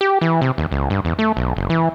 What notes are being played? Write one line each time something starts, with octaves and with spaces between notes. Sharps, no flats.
G4
E3
C3
D#2
C#2
G2
E2
A3
B1
F#1
E3